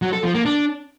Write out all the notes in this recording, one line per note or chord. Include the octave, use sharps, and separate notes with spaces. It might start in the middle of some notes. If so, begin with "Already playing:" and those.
F#3
A4
F3
A#3
D4